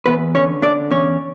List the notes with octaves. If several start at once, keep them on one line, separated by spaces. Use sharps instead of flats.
E2 B3 B4
D3 C#4 C#5
D3 D4 D5
E2 C#4 C#5